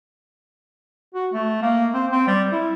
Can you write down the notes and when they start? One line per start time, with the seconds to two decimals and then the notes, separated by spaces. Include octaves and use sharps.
1.14 F#4
1.33 A3
1.62 A#3
1.94 C4
2.12 C4
2.27 G3
2.52 E4